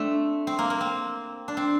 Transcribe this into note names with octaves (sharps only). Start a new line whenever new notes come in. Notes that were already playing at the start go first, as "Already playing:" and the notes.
Already playing: A3 C4 D4
C4
A#3
A#3
C4
D4
C4